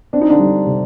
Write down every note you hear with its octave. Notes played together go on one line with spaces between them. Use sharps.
C4 D4
D#4
D3 D4
G3
C3